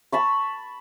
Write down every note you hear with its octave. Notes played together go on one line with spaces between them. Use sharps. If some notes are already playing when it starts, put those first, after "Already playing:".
A5 B5 C#6